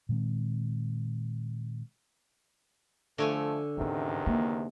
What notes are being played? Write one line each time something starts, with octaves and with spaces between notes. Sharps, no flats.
A#2 D#3 G#3 C4
D3 F3 A3 C#5 G#5
E2 G#2 C3 D#3 C#4
A#3